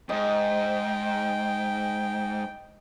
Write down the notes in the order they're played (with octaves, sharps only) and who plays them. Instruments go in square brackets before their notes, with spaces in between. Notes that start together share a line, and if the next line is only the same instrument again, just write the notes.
[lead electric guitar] F2 G#2 [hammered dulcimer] D#5 [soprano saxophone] G5